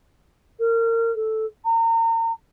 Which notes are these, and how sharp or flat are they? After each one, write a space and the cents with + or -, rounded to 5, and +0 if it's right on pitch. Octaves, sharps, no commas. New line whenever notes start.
A#4 -25
A4 -5
A#5 -35